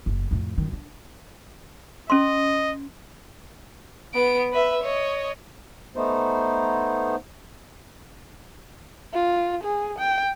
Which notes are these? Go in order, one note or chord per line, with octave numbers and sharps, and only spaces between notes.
F#1
F2 A2
F#2 D#3
D4
C#4 D#5 C6
B3 D7
B4 E5
C#5 D#5
A3 B3 D#4 C5
F4
G#4
G5